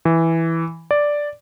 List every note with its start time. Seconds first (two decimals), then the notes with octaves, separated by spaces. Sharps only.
0.05 E3
0.91 D5